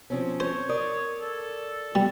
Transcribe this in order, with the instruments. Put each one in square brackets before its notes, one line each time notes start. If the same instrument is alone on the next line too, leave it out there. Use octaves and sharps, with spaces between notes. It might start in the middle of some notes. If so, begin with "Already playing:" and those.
[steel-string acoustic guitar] F3 C4 C#4
[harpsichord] C5 [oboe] C#5 [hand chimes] G6
[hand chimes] A#4 D#6 [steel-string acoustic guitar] D5
[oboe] A4
[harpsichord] G3 [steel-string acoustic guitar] B3